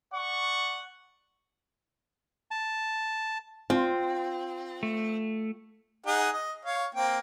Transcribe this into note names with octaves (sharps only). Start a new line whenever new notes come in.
D5 F#5 C#6
A5
C4 F4
A3
D#4 G#4 F#5
D#5
C#5 F5
A#3 C4 G5